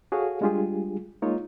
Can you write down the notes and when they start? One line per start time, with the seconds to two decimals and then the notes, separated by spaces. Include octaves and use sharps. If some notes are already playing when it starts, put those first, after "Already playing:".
0.12 F#4 G#4 A4 C#5 F5
0.41 G3 G#3 D4 F4 G4 G#4
1.22 G#3 A#3 D#4 F4 C#5